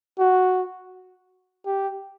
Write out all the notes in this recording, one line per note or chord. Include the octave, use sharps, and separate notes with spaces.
F#4
G4